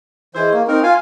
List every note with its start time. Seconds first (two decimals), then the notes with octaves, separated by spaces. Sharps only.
0.35 E3 E4 G#4 C5 D#5
0.53 A#3 C#6
0.68 C4 D#4 A#4
0.83 F4 F5 G#5